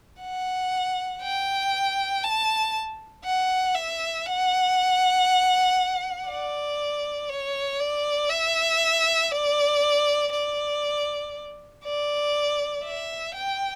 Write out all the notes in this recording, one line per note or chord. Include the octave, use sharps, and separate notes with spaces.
F#5
G5
A5
F#5
E5
F#5
D5
C#5
D5
E5
D5
D5
D5
E5
G5